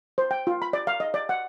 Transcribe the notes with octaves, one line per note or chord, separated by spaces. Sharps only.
C5
G5
F4
B5
D5
F5
D#5
D5
F#5